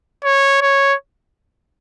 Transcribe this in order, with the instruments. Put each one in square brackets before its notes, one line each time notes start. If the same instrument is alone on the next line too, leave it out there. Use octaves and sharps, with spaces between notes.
[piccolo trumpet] C#5
C#5